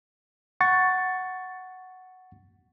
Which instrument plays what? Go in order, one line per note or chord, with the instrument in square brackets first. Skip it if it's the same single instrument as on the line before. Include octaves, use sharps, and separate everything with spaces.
[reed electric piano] F#5 C#6 A6